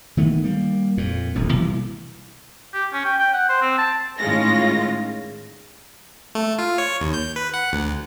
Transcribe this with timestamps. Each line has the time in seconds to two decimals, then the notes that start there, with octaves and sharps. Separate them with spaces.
0.17 D#3 E3 A3 B3
0.44 G3 A#3
0.97 F2 A#2
1.35 D#1 A#1 F2
1.53 B2 E3 G3 A#3
2.74 G4
2.93 C#4
3.05 G5
3.19 G5
3.33 F#5
3.49 C5
3.61 C4
3.78 A5
4.19 A2 D#3 G#3 C#4 F4 A#6
6.35 A3
6.59 F4
6.78 C#5
7.01 D#2
7.14 G6
7.36 B4
7.54 F#5
7.73 D2